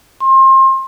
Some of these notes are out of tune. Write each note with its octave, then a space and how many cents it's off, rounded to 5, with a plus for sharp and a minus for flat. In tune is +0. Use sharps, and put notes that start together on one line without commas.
C6 +30